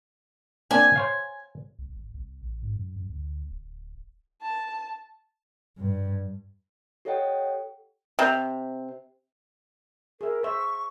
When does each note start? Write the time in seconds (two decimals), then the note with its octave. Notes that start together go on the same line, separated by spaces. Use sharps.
0.71 A#3 C4 D4 G#5
0.96 C5 C#5 F5
1.79 C2
1.97 G#1
2.14 C2
2.42 A1
2.62 G#2
2.76 F#2
2.96 F#2
3.10 D2
3.50 D1
4.42 A5
5.78 G2
7.05 G4 A4 C#5 D#5 F#5 G5
8.19 C3
10.21 G#4 A#4 E5
10.43 C5 E5 C#6